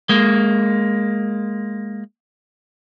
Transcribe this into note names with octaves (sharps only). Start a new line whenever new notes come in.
G#3 A#3